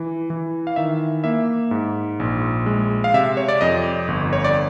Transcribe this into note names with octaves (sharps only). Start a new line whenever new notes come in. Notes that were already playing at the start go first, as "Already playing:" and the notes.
Already playing: E3
E3
F5
D#3 E5
A#3 E5
G#2
A#1
G#3
F5
C3 E5
C#5
D5
F2 D#5
G1
C#5
D5